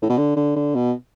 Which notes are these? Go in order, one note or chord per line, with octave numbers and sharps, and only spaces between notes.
A2
B2
D3
D3
D3
B2